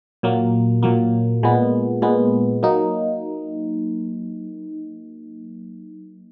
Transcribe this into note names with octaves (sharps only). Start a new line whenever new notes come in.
A#2 F#3 A#3
A#2 F#3 A#3
A#2 G#3 B3
A#2 G#3 B3
F#3 A#3 D#4